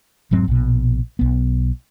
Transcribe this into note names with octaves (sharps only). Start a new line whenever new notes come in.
E1 G#2 F#3 C4
A#1 B2
B1 B3